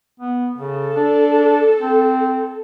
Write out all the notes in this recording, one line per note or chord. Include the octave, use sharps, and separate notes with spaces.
B3
C#3 A4
D4
C4